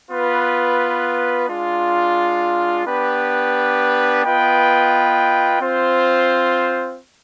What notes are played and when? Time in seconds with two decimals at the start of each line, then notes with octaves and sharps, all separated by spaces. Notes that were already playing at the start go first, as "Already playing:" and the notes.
0.10 B3 F4 B4
1.47 G#3 D4 F4
2.85 B3 D4 G4 B4
4.23 B3 F4 B4 D#5 G5
5.61 C4 F4 C5